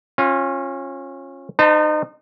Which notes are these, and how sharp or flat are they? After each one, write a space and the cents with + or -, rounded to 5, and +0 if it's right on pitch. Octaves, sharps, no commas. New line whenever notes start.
C#4 -25 F4 +10
D#4 -30 C5 -35 A5 +30